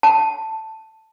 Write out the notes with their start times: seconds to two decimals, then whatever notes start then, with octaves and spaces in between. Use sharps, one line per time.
0.03 A5